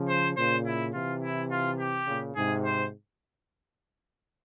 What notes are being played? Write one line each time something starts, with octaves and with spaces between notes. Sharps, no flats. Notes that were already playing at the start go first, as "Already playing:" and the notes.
Already playing: C#3 F3
C5
A#2 C#3 C5
E4
C3 E3 F4
E4
F4
G4
A#2 C#3
G#2 C3 G#4
C5